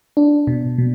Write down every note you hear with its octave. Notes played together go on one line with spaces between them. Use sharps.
D4
B2
B2